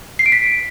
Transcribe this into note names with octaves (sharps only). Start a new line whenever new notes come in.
C7
D7
B6